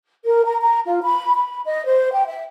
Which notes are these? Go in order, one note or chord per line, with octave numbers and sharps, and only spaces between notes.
A#4
A#5
A#5
F4
B5
B5
D#5
C5
G5
E5